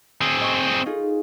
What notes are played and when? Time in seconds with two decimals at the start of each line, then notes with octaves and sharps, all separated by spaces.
0.21 C4 G#4
0.41 D#5 C#6 D6
0.86 D#4 F4 G#4